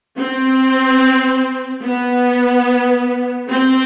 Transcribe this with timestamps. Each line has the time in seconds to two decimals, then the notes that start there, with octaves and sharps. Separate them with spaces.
0.19 C4
1.84 B3
3.51 C4